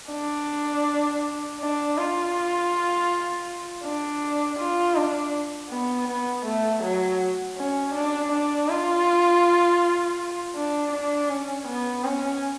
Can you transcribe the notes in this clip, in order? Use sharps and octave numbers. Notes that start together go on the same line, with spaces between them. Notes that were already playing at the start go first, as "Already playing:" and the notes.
D4
D4
F4
D4
F4
D4
B3
B3
A3
F#3
C#4
D4
D4
F4
D4
D4
C#4
B3
C#4